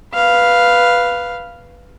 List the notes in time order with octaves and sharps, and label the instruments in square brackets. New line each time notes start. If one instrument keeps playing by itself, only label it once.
[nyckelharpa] B4 F5